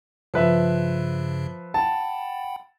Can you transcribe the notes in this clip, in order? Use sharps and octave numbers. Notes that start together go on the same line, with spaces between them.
G2 C#3 F3 B4 E5
F#5 G5 A5 B5